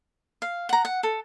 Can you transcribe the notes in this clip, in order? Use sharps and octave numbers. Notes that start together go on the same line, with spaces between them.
F5
F#5 A#5
F#5
A4